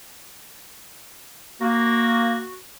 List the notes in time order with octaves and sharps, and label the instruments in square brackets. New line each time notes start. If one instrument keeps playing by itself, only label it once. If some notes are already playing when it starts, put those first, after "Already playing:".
[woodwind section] A#3 [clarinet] F#4